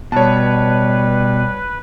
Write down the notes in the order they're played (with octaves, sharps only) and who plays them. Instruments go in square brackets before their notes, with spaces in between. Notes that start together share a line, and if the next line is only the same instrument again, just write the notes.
[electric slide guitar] B2 [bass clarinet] G3 [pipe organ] B4 [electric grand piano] C#5 A5